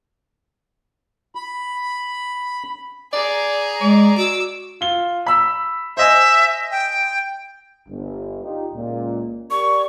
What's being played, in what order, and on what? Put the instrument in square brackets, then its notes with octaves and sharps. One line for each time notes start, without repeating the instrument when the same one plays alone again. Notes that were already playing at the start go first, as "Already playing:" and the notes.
[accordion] B5
[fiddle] G#4 A#5 [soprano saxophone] D5
[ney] G#3 [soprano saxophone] D5
[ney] F#4 [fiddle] D6 E6
[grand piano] F4 G7
B5 E6 B6
[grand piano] C5 D#5 G#5 [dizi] E5
[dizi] G5
[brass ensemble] G1
D#4 F4 G4
C#2 A#2
[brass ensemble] G4 A#4 D5 [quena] C#6